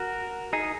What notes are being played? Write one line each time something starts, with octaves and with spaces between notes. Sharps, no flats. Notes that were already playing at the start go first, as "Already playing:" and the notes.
Already playing: F#4 A#4
D#4 G#4